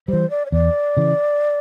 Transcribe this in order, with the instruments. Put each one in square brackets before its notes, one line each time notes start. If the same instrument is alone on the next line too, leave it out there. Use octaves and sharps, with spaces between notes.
[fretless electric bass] E3 G3 [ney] C5
[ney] D5
C#5
[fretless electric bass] E2 [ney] D5
[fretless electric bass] C#3 E3